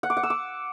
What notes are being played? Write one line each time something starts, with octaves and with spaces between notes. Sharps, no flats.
F#5
D6
F#5
E6
D6